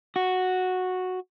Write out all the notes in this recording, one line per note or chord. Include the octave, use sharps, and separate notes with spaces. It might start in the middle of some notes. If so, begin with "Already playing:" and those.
F#4